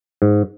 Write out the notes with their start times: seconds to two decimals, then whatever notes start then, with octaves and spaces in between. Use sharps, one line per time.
0.22 G#2